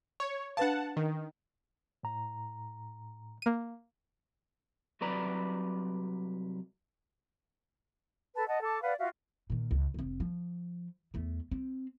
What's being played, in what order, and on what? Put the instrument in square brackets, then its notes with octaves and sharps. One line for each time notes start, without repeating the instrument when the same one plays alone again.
[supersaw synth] C#5
[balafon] D4 B4 F5 [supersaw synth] F#5 A5
[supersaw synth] D#3
[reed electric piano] A2 A#5
[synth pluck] A#3 D#7
[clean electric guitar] C2 C3 F#3 B4 D5 A#5
[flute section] A4 B4 A5
D#5 F#5 A5
A4 A5 D6
B4 D5 F5 F#5
F4 F#4 E5 F5
[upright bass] A#2 D#3
C#2
F1 C4
F3
E2 A3
C4